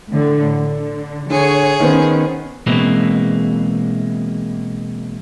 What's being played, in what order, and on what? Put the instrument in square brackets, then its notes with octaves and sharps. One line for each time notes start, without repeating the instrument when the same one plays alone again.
[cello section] A2 D3
D3
[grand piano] D3 [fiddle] G#4 [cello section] C#5
[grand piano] D#3 B3 C5 [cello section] C#4
[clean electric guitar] B2 E3 G#3 A#3 C4